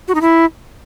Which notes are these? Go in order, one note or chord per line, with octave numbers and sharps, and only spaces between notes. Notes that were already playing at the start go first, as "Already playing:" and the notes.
F#4
D#4
E4